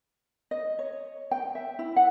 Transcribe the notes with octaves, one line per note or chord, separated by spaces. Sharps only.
D#5
C#5
G5
E5
E4
F#5